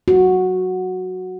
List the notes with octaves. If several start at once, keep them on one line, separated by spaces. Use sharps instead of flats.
F#4